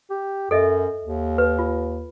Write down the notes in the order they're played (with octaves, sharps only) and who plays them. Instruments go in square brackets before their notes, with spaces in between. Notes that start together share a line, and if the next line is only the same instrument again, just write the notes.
[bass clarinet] G4
[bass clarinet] F#2 [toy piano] A4 D#5 E5
[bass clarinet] D#2
[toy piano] B4
F4